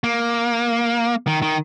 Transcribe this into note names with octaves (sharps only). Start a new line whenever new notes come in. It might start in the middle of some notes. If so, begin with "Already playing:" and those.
A#3
D#3
D#3